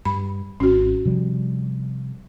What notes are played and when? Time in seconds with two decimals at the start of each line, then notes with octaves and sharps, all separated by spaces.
0.05 G2 B5
0.60 G#1 C#4 F#4
1.05 C3 F3 G3